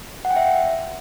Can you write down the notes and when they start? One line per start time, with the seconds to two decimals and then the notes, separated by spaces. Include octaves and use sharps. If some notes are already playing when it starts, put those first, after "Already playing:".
0.25 F#5
0.31 G5
0.36 E5